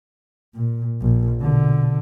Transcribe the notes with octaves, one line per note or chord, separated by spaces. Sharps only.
A#2
A#1
B2 D3